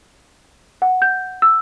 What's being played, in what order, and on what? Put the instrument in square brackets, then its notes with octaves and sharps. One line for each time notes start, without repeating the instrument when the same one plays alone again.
[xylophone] F#5
G6
E6